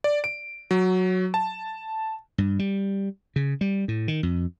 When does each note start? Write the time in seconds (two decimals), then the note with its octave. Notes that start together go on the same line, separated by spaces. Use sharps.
0.04 D5
0.24 D7
0.71 F#3
1.34 A5
2.38 G2
2.59 G3
3.36 C#3
3.61 G3
3.88 A2
4.08 D#3
4.23 F2